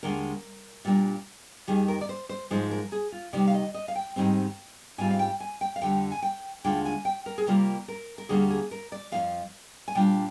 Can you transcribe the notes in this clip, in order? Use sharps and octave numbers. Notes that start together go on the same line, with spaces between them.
D#2 D3 G#3 A#4
A#2 G3 A#3 D4
F2 D#3 G3 G#4
A#4
D5
C5
C5
G#2 F3 G#3 D#4 C5
A#4
G#4
F4
C3 D#3 G3 D5
F5
D#5
D#5
F5
G5
G#2 D#3 G3 C4
G#2 G3 C4 F4 G#5
F5
G5
G#5
G5
F5
F2 D3 G3 G5
G#5
G5
D#2 D3 G#3 D4 F4 G5
G#5
G5
A#4
G#4
C3 G3 A#3 F4 A#4
A#4
A#4
D#2 D3 G3 A#3 G#4
G#4
A#4
D5
F2 C3 F3 F5
G#5
A#2 G3 D4 F4 G5